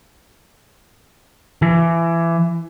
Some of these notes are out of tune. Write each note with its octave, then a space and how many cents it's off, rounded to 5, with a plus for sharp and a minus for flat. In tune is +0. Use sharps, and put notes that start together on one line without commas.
E3 +25